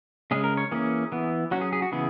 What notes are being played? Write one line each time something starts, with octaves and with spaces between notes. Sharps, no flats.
C#3 G#3 C#4 G#4
A#4
C#5
E3 A#3 C#4 G#4
E3 B3
F#3 C#4 F#4
G#4
G#4
F#4
C#3 E3 B3 G#4